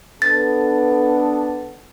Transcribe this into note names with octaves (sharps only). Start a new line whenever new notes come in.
B3 D4 A4 A6